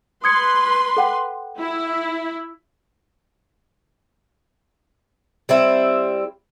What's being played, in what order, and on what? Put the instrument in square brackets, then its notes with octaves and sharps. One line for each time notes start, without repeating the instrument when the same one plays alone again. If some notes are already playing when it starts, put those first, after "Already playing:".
[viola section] B4 C6 [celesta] D#6 G#6 C#7
[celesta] A4 F#5 G5
[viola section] E4
[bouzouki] G3 C4 E4